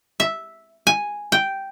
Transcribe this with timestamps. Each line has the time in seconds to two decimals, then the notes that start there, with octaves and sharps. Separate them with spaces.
0.20 E5
0.87 G#5
1.32 G5